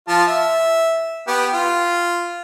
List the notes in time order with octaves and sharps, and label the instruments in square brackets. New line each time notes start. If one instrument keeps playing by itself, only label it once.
[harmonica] F3 F4 A5
E5
B3 G4 G5
F4